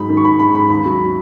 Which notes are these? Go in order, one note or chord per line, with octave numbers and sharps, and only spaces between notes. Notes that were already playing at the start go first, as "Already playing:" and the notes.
Already playing: G#2 F#3 G#3 B5
D#3
C#6
G#2 B5
G#3 B5
G#2 B5
D#2 B5
F#3